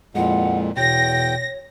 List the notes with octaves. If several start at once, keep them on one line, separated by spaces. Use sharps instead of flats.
F2 A#2 G#3 E4 F#5
E2 B2 C#5 G5 A#6